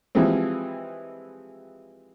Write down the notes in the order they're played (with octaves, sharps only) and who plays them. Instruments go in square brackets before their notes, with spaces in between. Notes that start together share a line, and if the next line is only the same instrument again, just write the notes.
[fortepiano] E3 F3 G3 G#3 C4